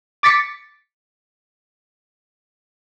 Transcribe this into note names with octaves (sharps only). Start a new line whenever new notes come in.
D6 A6 B6 C#7